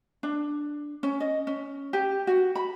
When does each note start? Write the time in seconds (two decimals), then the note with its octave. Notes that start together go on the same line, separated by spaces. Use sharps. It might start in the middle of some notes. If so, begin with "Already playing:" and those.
0.23 D4
1.03 C#4
1.20 D#5
1.47 C#4
1.93 G4
2.27 F#4
2.55 B5